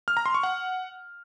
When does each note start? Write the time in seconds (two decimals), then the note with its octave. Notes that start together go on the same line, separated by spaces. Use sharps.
0.08 F6
0.17 A#5
0.26 C6
0.34 C#6
0.43 F#5